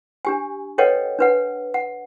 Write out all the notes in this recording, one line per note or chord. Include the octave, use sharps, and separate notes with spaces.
D4 G4 G#5
A4 B4 C#5 D#5 F#5 G5
D4 B4 F#5
F#5